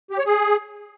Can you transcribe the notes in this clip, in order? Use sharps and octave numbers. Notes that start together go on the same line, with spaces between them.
G4
C#5
G#4